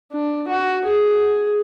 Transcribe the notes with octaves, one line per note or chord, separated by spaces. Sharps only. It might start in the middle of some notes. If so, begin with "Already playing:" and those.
D4
F#4
G#4